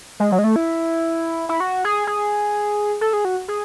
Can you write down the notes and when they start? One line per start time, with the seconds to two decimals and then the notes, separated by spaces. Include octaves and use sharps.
0.20 G#3
0.32 F#3
0.39 G#3
0.44 A3
0.56 E4
1.49 E4
1.60 F#4
1.85 G#4
2.07 G#4
3.01 A4
3.13 G#4
3.25 F#4
3.48 G#4